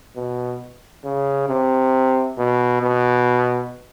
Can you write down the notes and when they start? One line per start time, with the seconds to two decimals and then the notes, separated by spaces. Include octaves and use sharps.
0.16 B2
1.04 C#3
1.49 C3
2.38 B2
2.82 B2